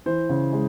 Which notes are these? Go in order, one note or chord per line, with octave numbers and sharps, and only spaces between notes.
E3 C5
C#3
G#3